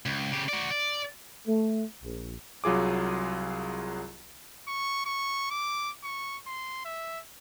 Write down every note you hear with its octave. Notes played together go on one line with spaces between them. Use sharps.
C#2
C#3 G4
F#4 D5
D5
A3
A#1
C2 F#3 F4 G#4 D6
C#6
C#6
D6
C#6
C6
E5